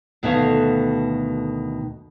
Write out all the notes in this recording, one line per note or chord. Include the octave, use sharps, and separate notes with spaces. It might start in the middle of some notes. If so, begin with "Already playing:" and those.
D2 B2 D#3 A3 C#5 F5